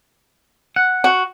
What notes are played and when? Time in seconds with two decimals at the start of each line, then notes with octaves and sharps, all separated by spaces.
0.76 F#5
1.04 F#4